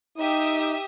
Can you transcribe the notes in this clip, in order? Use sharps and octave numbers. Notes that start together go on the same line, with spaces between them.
D#4 G4 E5 D#6